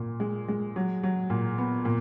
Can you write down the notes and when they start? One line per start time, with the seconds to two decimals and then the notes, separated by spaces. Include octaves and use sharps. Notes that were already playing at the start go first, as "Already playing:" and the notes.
Already playing: A#2
0.20 G#3
0.48 G#3
0.76 F#3
1.03 F#3
1.30 A#2
1.58 B3
1.85 A#2